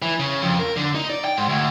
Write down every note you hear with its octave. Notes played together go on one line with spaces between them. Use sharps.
E3
C#3
F2
A#4
D3
D#4
D5
G5
G#2
D2